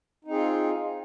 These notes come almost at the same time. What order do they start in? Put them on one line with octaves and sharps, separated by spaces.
D#4 C4 G#4 F4